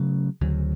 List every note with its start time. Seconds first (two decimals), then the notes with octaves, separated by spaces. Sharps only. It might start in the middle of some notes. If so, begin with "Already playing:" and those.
Already playing: C#3 F#3 A3
0.41 D2 C#3 F#3